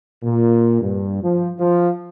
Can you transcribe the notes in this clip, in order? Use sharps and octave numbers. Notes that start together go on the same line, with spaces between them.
A#2
G2
F3
F3